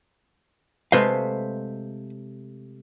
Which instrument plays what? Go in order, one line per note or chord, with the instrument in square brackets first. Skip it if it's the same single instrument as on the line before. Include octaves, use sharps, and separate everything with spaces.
[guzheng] C3 G#3 A3 [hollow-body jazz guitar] B4 C5 F5